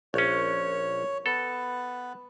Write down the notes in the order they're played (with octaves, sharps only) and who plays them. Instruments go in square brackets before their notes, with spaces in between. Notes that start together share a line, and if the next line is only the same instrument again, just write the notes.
[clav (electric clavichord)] A#1 C#4 [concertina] C#5
[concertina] B3 B4 [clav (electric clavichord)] A4